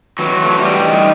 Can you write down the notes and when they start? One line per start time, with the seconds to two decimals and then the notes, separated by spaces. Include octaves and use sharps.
0.19 E3 F#3 F#4
0.41 A3
0.61 E3 G3 G4
0.83 D#4